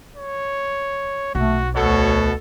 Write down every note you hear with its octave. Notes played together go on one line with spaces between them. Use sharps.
C#5
B1 A3 B3 F#4
D2 B2 F#4 A4 C#5